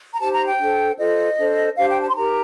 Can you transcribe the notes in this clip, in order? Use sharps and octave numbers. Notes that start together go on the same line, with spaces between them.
A#5
D#4 G4 C5 A5
A#5
G5
D4 A4 C5
F4 A4 C5 D#5
D4 A4 C5
D4 G4 C5 F5
G5
A5
C6
D#4 G4 A#4 A#5